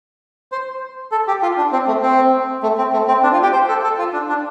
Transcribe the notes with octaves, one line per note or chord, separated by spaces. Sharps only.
C5
A4
G4
F4
D4
C4
A3
C4
A3
C4
A3
C4
D4
F4
G4
C5
A4
A4
F4
D4
D4